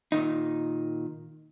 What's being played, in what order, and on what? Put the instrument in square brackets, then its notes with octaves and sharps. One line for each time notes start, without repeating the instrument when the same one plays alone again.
[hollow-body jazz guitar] A#2 D#3 D#4